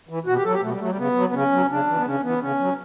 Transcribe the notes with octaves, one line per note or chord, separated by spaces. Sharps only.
E3
B2 F#4
G4
F#3 A4
G4
B2 A3
G3
F#3 A3
G3
C#3 B3
F#3
B3
C#3 C#4
F#3
C#3 D4
E3
B3
C#3 C#4
E3 B3
C#3 C#4
F#3